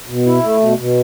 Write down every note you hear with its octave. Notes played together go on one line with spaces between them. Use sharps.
B2
E4
A3
B2
B2